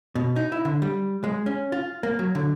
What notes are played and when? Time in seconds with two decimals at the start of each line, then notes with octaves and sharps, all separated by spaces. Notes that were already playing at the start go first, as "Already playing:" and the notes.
0.15 B2
0.36 D#4
0.52 E4
0.65 D3
0.82 G3
1.24 G#3
1.46 C#4
1.72 F4
2.03 A#3
2.19 F#3
2.35 D3